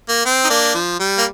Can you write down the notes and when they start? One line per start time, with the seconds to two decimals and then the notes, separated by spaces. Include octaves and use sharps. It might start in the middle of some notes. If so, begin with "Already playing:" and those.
0.09 A#3
0.25 C4
0.44 D#4
0.49 A#3 D4
0.74 F3
1.00 G3
1.18 A#3